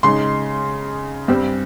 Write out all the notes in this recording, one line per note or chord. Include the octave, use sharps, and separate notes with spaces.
C#3 G#3 D#4 C6
G2 G3 C4